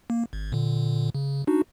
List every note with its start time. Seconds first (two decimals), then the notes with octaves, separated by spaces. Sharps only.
0.10 A#3
0.33 G#1
0.52 A#2 D3
1.15 C#3
1.47 D4 D#4 F#4